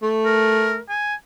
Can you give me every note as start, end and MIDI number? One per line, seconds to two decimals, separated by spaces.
0.03 0.78 57
0.25 0.79 70
0.89 1.15 80